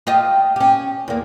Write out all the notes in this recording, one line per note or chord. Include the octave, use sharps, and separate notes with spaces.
F4 G4 D#5
C#4 G4
E2 A#3